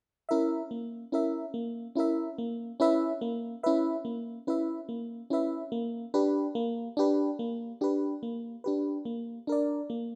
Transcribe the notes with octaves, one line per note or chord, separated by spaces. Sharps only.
C#4 E4 A#4 E5
A#3
C#4 E4 A#4 E5
A#3
C#4 E4 A#4 E5
A#3
C#4 E4 B4 E5
A#3
C#4 E4 B4 E5
A#3
C#4 E4 B4 E5
A#3
C#4 E4 B4 E5
A#3
D4 G4 B4
A#3
D4 G4 B4
A#3
D4 G4 B4
A#3
D4 G4 B4
A#3
D4 A#4 D5
A#3